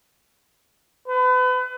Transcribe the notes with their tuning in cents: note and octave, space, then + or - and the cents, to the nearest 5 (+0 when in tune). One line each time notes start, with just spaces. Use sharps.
B4 +35